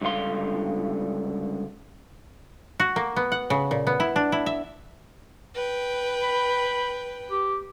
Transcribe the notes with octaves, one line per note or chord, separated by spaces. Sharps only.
C#2 G2 D3 F5 C6
F#4
A#3
B3
F#5
C#3
A#2
B3
E4
D4
E4
E5
B4 G5
B5
G4